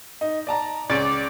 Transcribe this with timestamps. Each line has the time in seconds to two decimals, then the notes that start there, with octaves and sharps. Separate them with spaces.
0.21 D#4
0.47 D5 A5 A#5
0.90 C#2 C#4 D5 D7